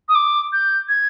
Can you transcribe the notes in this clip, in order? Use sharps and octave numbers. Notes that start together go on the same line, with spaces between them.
D#6
D6
G6
G#6